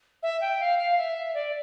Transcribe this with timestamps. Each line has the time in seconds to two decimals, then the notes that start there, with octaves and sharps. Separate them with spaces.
0.23 E5
0.41 G5
0.60 F5
0.79 F5
0.98 E5
1.34 D5